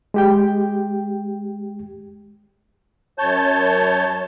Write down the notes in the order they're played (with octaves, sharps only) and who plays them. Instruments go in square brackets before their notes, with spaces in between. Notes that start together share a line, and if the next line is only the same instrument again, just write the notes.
[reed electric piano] G#3 G4 G5
[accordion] F#2 C#5 A5 G6